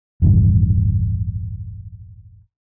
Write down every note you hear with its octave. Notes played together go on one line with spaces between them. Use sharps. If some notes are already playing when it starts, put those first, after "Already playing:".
E1 A1 G2 D#3